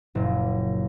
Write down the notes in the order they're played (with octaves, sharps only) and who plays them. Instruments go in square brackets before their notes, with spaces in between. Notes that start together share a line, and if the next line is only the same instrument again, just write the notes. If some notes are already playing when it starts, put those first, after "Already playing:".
[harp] F#1 A#2